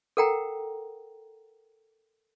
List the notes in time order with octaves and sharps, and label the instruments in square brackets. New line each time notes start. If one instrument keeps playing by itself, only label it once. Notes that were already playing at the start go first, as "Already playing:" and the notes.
[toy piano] A4 A#4 F#5 G5 A#5